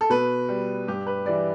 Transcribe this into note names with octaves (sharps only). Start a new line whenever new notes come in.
A4
B2 B4
G3
G2 G4
B4
E3 G3 D5